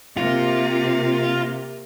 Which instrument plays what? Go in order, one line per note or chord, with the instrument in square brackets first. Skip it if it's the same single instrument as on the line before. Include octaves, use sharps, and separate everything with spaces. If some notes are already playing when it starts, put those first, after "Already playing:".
[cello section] C3 A#3 [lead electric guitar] F4